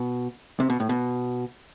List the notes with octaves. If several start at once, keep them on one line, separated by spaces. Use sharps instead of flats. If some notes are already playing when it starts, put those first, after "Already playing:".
Already playing: B2
C3
B2
A2
B2